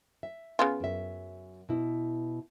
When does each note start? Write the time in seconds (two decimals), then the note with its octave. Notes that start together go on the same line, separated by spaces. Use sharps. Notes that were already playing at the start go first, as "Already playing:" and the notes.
0.23 E5
0.59 C#3 B3 F4
0.80 F#2 E5
1.69 B2 E4